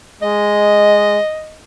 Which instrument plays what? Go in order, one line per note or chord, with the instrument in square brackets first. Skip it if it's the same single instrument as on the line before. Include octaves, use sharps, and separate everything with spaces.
[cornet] G#3 [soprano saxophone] D#5